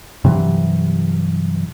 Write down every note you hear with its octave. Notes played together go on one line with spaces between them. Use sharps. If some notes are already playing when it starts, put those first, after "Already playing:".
G2 C3 E3 F#3